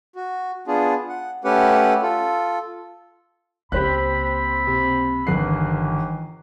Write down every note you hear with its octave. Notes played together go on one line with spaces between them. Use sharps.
F#4
B3 D4 F4 G#4
F#5
A3 C#4 G4 B4 F#5
F4 A4
C#2 A#3 C4 G4 C5 B5 F#6
C3
G1 D#3 E3 F#6 C7